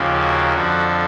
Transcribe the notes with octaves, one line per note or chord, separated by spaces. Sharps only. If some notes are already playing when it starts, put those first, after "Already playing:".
Already playing: D#2 C#3 F3 A#3
F#4
F2 D3 F3 F#4